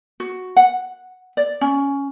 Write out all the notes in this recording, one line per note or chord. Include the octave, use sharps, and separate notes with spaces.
F#4
F#5
D5
C#4